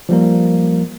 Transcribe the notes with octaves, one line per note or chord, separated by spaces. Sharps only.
F3 G3 A#3 A#4